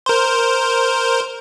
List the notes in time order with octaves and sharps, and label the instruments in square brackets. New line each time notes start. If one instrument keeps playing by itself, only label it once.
[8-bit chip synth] A#4 C5